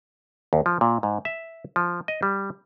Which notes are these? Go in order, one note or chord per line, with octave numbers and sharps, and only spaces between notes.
D#2
F3
A#2
G#2
E5
F3
D#5
G3